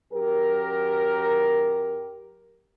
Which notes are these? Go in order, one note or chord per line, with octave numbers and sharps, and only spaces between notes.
F#2 G4 A#4